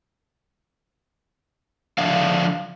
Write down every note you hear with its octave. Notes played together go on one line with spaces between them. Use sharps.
D3 F3 D4 E5 F5